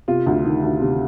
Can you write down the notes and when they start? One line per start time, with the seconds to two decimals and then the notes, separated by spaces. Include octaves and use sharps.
0.08 C3 F4
0.26 D2
0.45 D#3
0.63 D2
0.82 C3